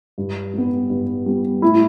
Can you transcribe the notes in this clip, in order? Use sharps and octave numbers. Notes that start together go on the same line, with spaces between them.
G2
G3 B3
G2
G3 B3
A2 E4